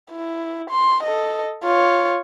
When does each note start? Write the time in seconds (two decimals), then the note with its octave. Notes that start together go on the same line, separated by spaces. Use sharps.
0.12 E4
0.70 C6
1.03 A4 D#5
1.64 F4 C#5